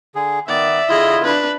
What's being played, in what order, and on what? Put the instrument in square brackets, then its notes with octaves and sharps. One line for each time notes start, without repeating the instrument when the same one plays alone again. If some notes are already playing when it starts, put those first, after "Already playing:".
[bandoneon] D3 G#4
[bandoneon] D#3 B3 [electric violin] D5 [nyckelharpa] E5
[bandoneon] D3 E4 F4 [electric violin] G#4 D#5
[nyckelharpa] D4 [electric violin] B4